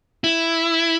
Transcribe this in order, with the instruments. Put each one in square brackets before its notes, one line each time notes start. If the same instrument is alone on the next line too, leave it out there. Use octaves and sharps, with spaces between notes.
[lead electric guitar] E4